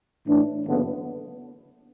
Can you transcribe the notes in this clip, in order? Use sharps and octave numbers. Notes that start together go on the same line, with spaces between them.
A2 E3 D4
F#1 E2 D3 B3